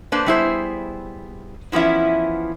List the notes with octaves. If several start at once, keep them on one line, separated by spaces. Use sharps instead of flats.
A#3 D4 B4 C5
G3 B3 E4 G#4 C5
E3 F3 B3 C#4 E4